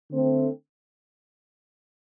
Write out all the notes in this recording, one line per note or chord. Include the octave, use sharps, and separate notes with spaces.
D3 A3 C4